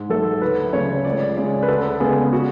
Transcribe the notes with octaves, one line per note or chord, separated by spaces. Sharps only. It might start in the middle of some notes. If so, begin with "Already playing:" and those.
Already playing: G#2
F#3 A3 A4
D2 B4
C#3 F#3 A3 C#5
C#2 D5
C#5
D5
C#3 G#3 D5
B4
D2 A4
C#3 G#3 B3 G#4
F#4